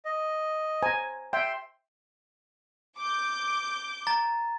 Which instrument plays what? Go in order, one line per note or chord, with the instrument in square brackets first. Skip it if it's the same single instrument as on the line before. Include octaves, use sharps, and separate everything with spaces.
[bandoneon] D#5
[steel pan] C5 G#5 A#5
[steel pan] E5 G5 [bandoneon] C6
[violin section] D6 G6
[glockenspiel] A#5 A6